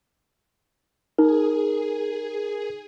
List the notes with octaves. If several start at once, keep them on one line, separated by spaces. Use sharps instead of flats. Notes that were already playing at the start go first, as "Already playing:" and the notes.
D#4 G#4 A#4